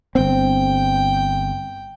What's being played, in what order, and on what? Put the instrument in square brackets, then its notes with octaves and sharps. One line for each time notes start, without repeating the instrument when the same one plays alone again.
[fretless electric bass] G1 C4 [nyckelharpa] G5